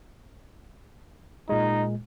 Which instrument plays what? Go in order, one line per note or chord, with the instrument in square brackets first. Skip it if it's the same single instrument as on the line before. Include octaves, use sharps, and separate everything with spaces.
[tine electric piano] A#2 G#3 [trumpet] D#4